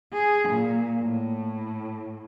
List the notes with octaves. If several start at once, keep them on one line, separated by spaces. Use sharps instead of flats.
G#4
A#2
A2